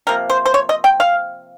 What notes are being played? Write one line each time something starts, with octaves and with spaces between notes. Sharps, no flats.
C3 F3 A#3 A#4
C5
C5
C#5
D#5
G5
F5